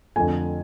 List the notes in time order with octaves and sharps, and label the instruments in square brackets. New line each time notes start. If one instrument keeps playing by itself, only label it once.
[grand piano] F2 D3 F3 A3 G#5